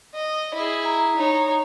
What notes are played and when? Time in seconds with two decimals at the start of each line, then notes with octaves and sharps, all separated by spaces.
0.15 D#5
0.55 E4 G#4
0.85 A#5
1.17 D#4 C#5